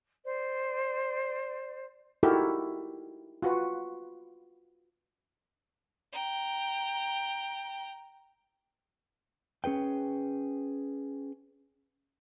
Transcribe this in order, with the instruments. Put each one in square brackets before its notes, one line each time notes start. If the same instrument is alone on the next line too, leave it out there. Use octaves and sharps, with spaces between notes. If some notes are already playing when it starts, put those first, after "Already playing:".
[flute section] C5 D5
[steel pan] D#4 E4 F#4 G4 A4 A#4
F4 F#4 B4
[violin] G5 A#5
[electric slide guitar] C#4 G#4 B4 G5